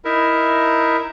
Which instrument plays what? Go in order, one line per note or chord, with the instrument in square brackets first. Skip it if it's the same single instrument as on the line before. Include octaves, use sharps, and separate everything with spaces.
[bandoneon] D#4 E4 A#4 E5